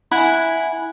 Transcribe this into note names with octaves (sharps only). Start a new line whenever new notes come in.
E4 F#5 G#5